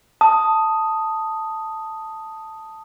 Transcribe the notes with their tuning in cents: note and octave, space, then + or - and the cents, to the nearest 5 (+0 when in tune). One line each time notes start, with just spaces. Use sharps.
A5 +5 D#6 +0